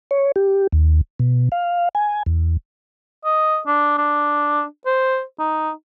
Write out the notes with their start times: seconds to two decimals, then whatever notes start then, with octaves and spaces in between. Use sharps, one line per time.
0.11 C#5
0.36 G4
0.72 D#2
1.19 B2
1.52 F5
1.95 G#5
2.26 E2
3.25 D#5
3.67 D4
3.98 D4
4.86 C5
5.39 D#4